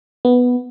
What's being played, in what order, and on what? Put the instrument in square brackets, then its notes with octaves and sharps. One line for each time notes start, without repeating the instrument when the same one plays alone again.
[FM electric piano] B3